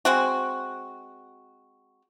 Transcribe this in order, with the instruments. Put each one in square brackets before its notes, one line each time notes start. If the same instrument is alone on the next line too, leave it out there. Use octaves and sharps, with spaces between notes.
[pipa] G#3 C4 F#4